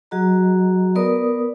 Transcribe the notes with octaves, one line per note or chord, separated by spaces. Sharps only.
F#3 F#4 G#4 D#5 A#5
B3 A#4 B4 D5 D#6